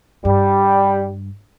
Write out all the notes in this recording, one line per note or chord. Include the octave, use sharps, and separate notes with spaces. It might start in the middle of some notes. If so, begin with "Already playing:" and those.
G2 G3